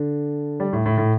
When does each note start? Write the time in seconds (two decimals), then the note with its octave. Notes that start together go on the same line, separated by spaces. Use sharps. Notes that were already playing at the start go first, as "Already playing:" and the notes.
Already playing: D3
0.60 G3
0.73 A2
0.86 A2
0.98 A2